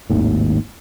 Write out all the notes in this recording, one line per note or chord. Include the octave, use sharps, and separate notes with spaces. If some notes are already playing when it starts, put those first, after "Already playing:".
G#1 D#2 A2